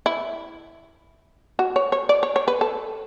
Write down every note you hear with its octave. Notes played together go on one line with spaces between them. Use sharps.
E4
F#4
C#5
C#5
D5
C#5
C#5
B4
A4